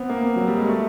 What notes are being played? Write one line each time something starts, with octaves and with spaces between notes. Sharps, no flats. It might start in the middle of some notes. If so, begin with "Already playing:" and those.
Already playing: B3 C4
A#3
F#3
G3
G#3
A3